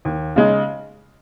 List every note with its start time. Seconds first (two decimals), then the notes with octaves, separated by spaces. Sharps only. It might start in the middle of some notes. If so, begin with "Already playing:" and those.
0.05 D#2
0.36 C#3 G#3 D#4